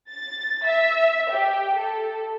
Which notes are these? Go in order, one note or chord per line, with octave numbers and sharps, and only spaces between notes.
A6
E5
G4
A4